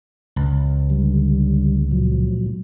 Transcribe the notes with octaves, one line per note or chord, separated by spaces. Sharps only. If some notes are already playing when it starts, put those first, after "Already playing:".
C#2
D3 G3
A#2 F3 F#3